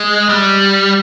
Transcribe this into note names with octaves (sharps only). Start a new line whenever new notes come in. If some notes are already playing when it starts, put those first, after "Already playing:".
Already playing: G#3
G3